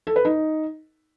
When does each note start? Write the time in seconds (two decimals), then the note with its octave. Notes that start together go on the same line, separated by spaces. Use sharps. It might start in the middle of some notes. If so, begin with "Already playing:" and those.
0.07 A4
0.16 B4
0.25 D#4